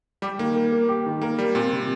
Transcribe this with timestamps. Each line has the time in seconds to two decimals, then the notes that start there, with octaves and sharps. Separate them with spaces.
0.22 G3 G4
0.39 D#3 A#3
0.56 A#4
0.72 A#3
0.89 G4
1.06 D#3
1.21 A#3 A#4
1.38 G3 A#3
1.55 A#2 C4
1.73 C3